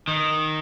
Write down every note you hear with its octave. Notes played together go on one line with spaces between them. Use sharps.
D#3